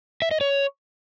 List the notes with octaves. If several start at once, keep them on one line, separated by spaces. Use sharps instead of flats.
E5
D#5
C#5